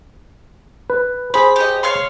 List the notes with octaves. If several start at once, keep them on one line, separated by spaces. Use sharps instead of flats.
B4
G#4 C5 B5
G4 D#5
C#5 F5 C6